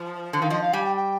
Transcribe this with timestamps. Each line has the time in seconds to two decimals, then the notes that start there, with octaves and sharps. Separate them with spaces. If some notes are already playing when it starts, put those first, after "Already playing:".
Already playing: F3
0.33 D3
0.42 D#3 F5
0.50 F3 D#5
0.62 F5
0.73 G3 G#5
0.84 G5
0.96 G5